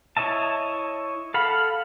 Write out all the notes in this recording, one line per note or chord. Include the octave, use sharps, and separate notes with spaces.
E4 C#5 D#5 E5 A5
A4 F5 F#5 B5